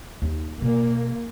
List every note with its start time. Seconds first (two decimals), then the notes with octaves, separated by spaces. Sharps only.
0.22 D#2 D#4
0.62 B2 A#3